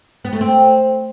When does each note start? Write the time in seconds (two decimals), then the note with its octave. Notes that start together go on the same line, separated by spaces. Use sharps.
0.25 B3
0.33 A3
0.41 C4